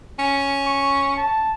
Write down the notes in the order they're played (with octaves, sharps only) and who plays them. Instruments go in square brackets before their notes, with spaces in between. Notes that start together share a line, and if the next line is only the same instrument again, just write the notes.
[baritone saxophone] C#4
[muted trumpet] C#6
A5